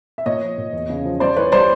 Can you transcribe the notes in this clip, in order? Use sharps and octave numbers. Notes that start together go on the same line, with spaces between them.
E5
A#2 C#5 D#5
F3
A#2
E2
C#3
F3
G3 C5 D5
E3 B4 C#5
G3 C5 D5